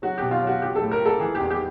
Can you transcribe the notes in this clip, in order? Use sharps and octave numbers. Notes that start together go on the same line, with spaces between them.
F#3 F#4
B2 G4
F4
F#3
F#4
F3 G4
A4
A2
A#4
F3
A4
E3 G#4
G4
E2
G4